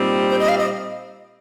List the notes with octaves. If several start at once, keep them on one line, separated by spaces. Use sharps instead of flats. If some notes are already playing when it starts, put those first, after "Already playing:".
Already playing: A#2 G3 C4 D#4
C5
D#5
F5
D#5